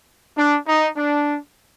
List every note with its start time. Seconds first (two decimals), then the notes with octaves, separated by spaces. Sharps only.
0.38 D4
0.67 D#4
0.97 D4